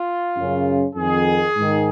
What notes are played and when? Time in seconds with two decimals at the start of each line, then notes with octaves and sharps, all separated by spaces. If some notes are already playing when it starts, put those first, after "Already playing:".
Already playing: F4
0.35 F#2 C#3
0.95 F2 D#3 G#4
1.55 G#2 D#3